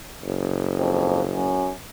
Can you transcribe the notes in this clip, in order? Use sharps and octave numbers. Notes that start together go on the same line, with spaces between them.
F#1
F2
F#2